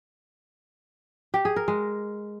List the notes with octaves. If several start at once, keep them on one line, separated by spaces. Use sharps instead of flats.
G4
G#4
A#4
G#3